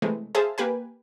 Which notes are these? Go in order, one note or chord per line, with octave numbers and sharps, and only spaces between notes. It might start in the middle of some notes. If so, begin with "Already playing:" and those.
C3 E3 G#3 A3
G#4 C5 E5 F5 A5
A#3 G4 B4 G#5